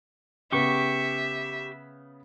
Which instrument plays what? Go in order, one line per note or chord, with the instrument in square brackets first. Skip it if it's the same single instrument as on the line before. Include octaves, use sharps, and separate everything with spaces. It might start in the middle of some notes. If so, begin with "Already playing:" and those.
[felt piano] C#3 B3 [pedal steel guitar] G4 C#6 [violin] E5